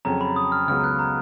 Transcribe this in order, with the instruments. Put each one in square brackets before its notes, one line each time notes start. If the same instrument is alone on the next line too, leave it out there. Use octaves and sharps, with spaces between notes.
[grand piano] F2 C#3 F#3 C#4 [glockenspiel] A#5
[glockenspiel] B5
D#6
F6
[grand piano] C#2 C#3 F#3 B3 [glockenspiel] F6
[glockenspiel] F#6
A#5